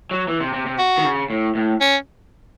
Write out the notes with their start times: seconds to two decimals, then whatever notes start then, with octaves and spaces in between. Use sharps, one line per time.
0.11 F#3
0.28 E3
0.41 C3
0.53 C3
0.66 C3
0.79 F#4
0.98 D#3
1.05 C#3
1.30 A2
1.55 A2
1.81 C#4